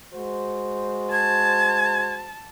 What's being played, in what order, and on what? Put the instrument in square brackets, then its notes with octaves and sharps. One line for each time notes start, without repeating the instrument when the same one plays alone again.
[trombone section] G#3 F#4 C5
[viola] A5 [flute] G#6